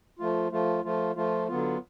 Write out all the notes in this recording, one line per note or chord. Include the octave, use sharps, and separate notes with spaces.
F3 A3 F4
F3 A3 F4
F3 A3 F4
F3 A3 F4
D3 F#3 B3 F4